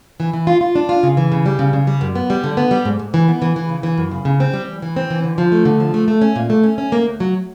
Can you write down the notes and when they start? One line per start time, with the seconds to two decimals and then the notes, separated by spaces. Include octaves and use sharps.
0.20 E3
0.33 E3
0.47 F4
0.61 F4
0.75 D4
0.89 F4
1.03 C#3
1.17 E3
1.32 C#3
1.46 G3
1.59 C#3
1.73 C#3
1.87 G3
2.01 F#2
2.15 B3
2.30 G3
2.44 D3
2.57 B3
2.71 G3
2.85 G#2
2.99 G#2
3.14 E3
3.28 B3
3.42 E3
3.56 E3
3.69 C#3
3.83 E3
3.98 F#2
4.11 C#3
4.25 C#3
4.40 C4
4.53 G3
4.68 E3
4.82 E3
4.96 C4
5.10 E3
5.24 D3
5.38 F3
5.52 A3
5.65 D3
5.80 F3
5.94 A3
6.08 A3
6.21 C#4
6.36 A#2
6.50 A3
6.63 C#4
6.78 C#4
6.92 A#3
7.06 D2
7.20 F#3